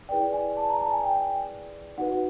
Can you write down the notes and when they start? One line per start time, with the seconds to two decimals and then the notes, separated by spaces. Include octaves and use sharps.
0.09 E4 G#4 B4 D5 G5
0.32 G#5
0.57 A5
0.69 A#5
0.81 A5
0.91 G#5
1.03 G5
1.98 D#4 F#4 B4 F#5